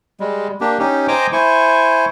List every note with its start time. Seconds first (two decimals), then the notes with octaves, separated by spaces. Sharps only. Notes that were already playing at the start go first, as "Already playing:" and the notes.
0.20 G3 G#3
0.61 A#3 D4 G4
0.79 C#4 D#4 G4
1.08 C5 D#5 G5 G#5 A#5 D6
1.33 E4 C5 G#5 C#6